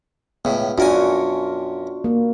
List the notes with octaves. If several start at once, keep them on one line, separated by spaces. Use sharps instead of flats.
C#2 A2 B3
F#2 D4 F4 F#4 A#4 G#5
A#3